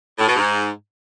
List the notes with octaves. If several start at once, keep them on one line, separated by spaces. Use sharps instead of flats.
A2
B2
G#2